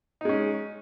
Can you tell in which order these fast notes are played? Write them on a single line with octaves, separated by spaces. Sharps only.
D#4 G#3 C#4